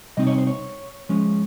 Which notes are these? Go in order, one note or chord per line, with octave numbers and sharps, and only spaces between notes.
C3 G3 C4 D#4 D#5
C#5
C5
C#5
F3 G#3 C#4